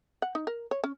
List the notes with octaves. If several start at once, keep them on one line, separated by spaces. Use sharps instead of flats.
F#5
D#4
A#4
C#5
C#4